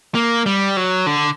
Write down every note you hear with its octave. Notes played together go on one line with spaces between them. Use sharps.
A#3
G3
F#3
D3